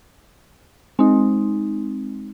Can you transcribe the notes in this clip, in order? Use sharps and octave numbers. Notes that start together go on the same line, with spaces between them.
G#3 C4 D#4